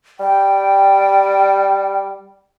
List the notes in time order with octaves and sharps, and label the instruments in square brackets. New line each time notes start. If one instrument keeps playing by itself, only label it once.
[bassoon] G3 [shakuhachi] G5